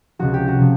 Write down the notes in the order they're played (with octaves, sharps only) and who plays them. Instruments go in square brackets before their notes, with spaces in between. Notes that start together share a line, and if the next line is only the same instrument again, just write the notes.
[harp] C#2 C3 F3 F#4
G4
F#4
C3 F3